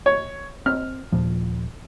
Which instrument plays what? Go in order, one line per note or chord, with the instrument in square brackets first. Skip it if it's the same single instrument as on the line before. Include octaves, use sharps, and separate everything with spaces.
[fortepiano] C#5
[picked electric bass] C4 [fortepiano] F6
[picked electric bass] D#2 A#2 F3